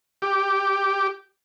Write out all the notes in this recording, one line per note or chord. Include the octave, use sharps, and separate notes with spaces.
G4